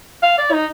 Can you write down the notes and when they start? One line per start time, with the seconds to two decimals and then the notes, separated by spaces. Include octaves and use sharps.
0.22 F5
0.38 D5
0.52 D#4